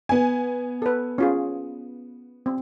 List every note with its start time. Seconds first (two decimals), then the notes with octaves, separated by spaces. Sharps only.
0.09 B3 G#5
0.82 A4 B4
1.18 C#4 F4 G#4
2.46 C4